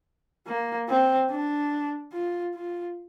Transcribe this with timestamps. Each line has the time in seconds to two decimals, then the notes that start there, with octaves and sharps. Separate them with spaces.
0.46 A#3
0.88 C4
1.30 D4
2.13 F4
2.55 F4